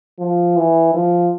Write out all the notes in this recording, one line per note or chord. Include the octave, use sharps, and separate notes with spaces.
F3
E3
F3